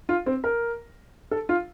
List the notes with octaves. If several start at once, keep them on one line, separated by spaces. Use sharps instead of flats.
F4
C4
A#4
A4
F4